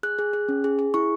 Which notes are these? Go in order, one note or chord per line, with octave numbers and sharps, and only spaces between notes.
G#4 F#6
G#4
G#4
C#4
G#4
G#4
E4 C#6